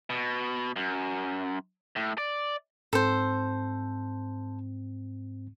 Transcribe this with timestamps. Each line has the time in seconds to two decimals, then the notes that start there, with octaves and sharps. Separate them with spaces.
0.10 B2
0.76 F#2
1.96 A2
2.18 D5
2.93 G#2 C4 A4 C5